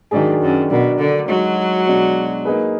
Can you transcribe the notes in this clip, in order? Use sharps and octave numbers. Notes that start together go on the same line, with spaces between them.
G#2 D#3 F#3 D4 G#4
F#2
B2 F#3 D4 F#4 A#4
D3
F#3 G#3 D#4 F#4
B2 G#3 D4
A#3 D#4 G#4 B4